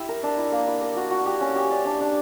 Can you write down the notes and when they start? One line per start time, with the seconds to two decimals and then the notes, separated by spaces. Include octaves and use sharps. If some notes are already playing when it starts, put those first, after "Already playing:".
Already playing: E4 G4 E5
0.08 A#4
0.23 D4
0.38 E4
0.52 A#3
0.67 E4
0.82 A#4
0.97 F#4
1.11 F#4
1.25 G4
1.40 C#4
1.56 G4
1.71 D5
1.85 D4
2.00 D4